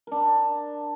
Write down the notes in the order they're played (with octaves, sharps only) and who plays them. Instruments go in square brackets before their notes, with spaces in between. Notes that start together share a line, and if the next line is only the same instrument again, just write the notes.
[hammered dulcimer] D4 A#4